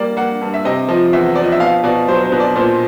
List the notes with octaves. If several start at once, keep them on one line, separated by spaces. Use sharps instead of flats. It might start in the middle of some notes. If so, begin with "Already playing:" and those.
Already playing: G3 A#3 D5
A#3 F#5
G2
E5
C3 D#5
F3 D#5
E2 E5
F3 D5
D#5
E5
B2 F5
B2 D5
F#3 C5
C5
B2
D5
A#2 C5